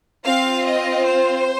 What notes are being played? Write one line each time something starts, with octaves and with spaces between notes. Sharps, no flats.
C4 F4 F5
D#5
C5